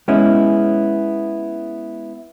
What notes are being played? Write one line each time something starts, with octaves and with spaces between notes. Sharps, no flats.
G#3 B3 C#4 E4